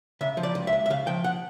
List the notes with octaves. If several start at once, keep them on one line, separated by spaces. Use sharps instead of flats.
C#3 E5
F3
D5
C#2
E5
C#2
E5
C#3 F5
F3 G5
F#5